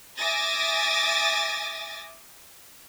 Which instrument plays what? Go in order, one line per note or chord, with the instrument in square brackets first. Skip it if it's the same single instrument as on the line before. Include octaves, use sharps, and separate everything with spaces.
[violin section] E5 G#5 D6 D#6 A6 A#6